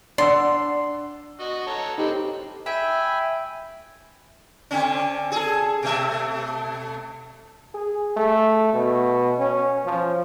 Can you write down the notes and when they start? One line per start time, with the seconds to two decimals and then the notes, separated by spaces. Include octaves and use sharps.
0.18 D4 D5 F#5 C6 E6
1.40 F#4 D#5 F#5
1.67 A4 C#5 A#5
1.98 C4 D#4 G4 A4 B5
2.66 E5 G5 G#5 B5
4.71 D3 C4 C#4
5.32 G#4 A4
5.83 B2 A3 E5
7.74 G#4
8.17 A3
8.74 B2
9.39 C#4
9.86 F3